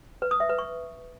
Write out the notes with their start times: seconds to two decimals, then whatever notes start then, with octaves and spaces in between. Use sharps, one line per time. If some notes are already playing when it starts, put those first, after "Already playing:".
0.22 B4
0.31 D#6
0.40 E5
0.49 B4
0.59 C#6